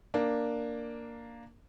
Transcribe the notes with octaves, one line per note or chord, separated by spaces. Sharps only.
A#3 D4